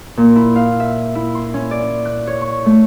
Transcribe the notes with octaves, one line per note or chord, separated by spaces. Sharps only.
A#2
E4
F5
E5
E4
C6
C#4
D5
F#6
C#5
C#6
A3